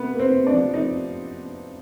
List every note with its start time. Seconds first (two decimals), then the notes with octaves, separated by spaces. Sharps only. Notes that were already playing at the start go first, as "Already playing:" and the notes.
Already playing: C3 B3 B4
0.12 A#3
0.19 C4 C5
0.33 C3
0.47 D4 D5
0.53 F3
0.73 C3 D#4 D#5